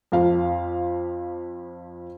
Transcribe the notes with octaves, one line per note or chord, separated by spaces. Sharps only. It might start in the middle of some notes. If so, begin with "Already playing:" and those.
F2 F3 F5